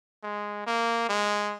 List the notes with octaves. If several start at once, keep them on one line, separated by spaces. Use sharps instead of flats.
G#3
A#3
G#3